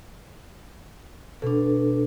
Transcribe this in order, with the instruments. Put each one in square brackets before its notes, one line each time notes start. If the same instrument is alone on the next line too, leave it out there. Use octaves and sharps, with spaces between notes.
[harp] B2 [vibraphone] D4 A4